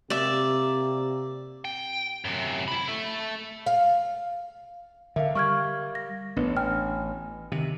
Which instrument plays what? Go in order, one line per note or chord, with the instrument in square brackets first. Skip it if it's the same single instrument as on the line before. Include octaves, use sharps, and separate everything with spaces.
[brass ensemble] C3 A#3 G4 [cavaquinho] D5 E5
[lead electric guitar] G5
F#2 C3
E4 B5
A4 E5
[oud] F5
[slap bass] D3 [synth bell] A#4 F5 [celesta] E5
[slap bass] G3 [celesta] C#6 F6 G#6
[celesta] A#6
[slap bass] A1 [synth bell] B3 D4 B4
[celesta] G5 F6 [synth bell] G#5
[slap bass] C3 [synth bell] D#3 D#7